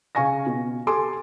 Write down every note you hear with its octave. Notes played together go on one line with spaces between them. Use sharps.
C#3 F5 G#5 C#6 A#6
B2
G4 A4 G#5 C6 D6